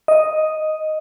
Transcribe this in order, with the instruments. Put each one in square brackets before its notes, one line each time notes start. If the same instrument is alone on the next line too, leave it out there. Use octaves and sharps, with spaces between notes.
[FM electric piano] D#5